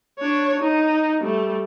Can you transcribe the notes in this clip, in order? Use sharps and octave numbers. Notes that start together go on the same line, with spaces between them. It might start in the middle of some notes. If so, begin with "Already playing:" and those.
D4 C#5
D#4
G3 A3